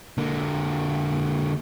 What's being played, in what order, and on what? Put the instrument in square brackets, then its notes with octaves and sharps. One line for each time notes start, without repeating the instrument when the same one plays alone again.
[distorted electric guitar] D3 A#3